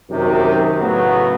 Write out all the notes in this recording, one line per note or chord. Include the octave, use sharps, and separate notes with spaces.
F#2 C3 D#3
A2 C#3 F#3 A3 B3